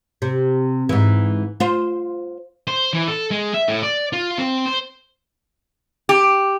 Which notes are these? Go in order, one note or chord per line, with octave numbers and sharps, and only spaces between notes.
C3
G#2 E3
F4 C5
C5
E3
A4
G#3
E5
A2
D5
F4
C4
C5
G4